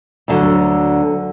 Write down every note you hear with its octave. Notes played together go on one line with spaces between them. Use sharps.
D2 D3 F#3